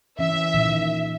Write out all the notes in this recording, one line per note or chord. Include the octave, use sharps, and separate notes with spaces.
E3 C#4 E5
A#2 D#3